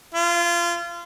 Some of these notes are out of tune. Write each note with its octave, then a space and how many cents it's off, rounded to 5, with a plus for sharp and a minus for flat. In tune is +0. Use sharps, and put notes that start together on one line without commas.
F4 -25